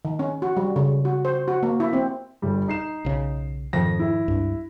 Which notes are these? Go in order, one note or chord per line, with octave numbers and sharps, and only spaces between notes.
D#3
C#4
F#4
G3
C#3
F#4
C5
F#4
A#3
E4
C4
G1 G3
D#4 C7 E7
B1 C#3
F2 G#2 D#3 F3 A#6
E4
C#2 G2